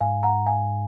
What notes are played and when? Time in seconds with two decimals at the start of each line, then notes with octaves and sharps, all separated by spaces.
0.01 G#2 F5 G#5
0.23 F#5 A#5
0.46 F5 G#5